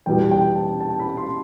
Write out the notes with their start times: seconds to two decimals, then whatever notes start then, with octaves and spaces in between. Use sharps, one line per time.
0.06 E2 B2 G3 B3 G5
0.31 G5
0.55 A5
0.80 A5
0.99 B5
1.17 C6